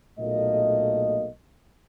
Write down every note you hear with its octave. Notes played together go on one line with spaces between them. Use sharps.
B1 A#2 A3 A#3 D#5